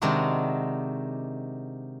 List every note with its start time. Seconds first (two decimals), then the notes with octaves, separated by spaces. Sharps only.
0.02 C3 D#3 G#3 D4 D#4 F#4